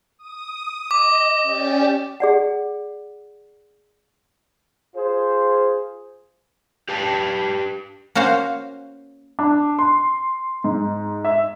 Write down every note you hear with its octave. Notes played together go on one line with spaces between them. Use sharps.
D#6
D#5 D6
C#4 G4 D5
G#4 D5 F#5
F4 G#4 C5
G4 B4 F5 A5
A#3 C#4 F#4 C5 F5
D4
C6
G#2
E5